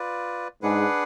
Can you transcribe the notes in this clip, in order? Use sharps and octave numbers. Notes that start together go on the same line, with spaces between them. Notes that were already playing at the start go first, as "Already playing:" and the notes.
Already playing: F4 B4 D5
G#2 D4 G#4 B4 F#5